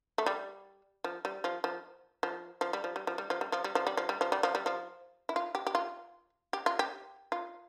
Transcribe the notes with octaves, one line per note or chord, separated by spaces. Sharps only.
A3
G3
F3
G3
F3
F3
F3
F3
G3
F3
G3
F3
G3
F3
G3
F3
G3
F3
G3
F3
G3
F3
G3
F3
G3
F3
E4
F4
G4
G4
F4
G4
F4
G4
F4